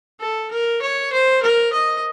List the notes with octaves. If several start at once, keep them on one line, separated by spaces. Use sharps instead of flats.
A4
A#4
C#5
C5
A#4
D#5